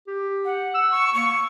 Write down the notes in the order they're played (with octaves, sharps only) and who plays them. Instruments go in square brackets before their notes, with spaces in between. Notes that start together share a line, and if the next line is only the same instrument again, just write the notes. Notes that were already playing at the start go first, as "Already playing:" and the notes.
[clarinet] G4
[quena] F#5
[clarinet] E6
[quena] C#6
[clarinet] A#3 [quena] C#6